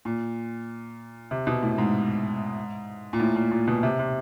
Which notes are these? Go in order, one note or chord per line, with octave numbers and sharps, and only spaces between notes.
A#2
C3
B2
A2
G#2
A#2
A2
A#2
A#2
B2
C3
C3